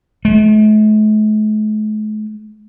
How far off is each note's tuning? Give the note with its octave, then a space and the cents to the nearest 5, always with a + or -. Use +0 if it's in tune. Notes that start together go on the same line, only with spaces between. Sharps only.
A3 -45